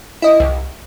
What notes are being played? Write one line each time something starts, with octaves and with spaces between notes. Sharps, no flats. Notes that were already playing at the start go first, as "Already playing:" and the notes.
E4 D#5
C2